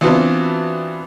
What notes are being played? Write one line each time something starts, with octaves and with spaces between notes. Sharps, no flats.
E3 B3 C4 D4 F4 F#4